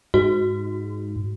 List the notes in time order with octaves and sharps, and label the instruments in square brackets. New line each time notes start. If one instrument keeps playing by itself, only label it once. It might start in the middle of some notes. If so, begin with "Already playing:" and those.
[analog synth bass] G#2 [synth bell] F#4